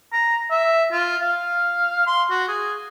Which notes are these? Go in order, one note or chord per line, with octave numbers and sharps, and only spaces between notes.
A#5
E5
F4
F5
C6
F#4
G#4